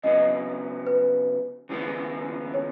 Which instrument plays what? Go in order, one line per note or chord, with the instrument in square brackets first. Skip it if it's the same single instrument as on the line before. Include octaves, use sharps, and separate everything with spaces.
[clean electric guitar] C#2 C#3 F#3 B3 [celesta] D#5
[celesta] B4
[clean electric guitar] D#2 C#3 F3 G#3 B3
[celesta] C#5